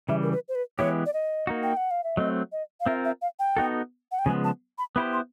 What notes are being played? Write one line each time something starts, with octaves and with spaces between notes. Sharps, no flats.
C#3 E3 G3 E5
A#4
B4
C5
B4
E3 G#3 B3 E4 G4 C#5
D5
D#5
A#3 D#4 F#4
G5
F#5
F5
E5
F#3 A3 C4 D#5
D#5
F5
C4 F4 A#4 E5
E5
F5
G5
B3 D#4 F#4 A4
F#5
G5
C#3 F3 G#3 B3 G#5
A5
B5
B3 E4 G4 C5 B5
C6